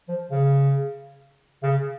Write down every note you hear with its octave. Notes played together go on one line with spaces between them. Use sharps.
F3
C#3
C#3